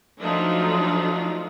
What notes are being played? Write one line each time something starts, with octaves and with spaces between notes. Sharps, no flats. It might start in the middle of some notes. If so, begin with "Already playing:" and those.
F3 F#3 A3 D4 D#4 F4